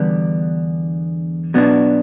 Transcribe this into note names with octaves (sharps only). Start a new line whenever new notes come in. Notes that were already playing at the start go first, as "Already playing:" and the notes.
Already playing: E2 D3 G3 B3 D4
B2 F#3 B3 D4 F#4